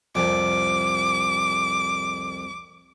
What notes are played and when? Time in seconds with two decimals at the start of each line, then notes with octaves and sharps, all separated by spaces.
0.15 C2 F2 D6